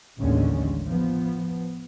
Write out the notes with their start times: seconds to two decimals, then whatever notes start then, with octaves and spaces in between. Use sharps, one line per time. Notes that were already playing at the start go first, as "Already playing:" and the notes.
0.19 A1 D#2 D3 G#3 C#4
0.87 F3 B3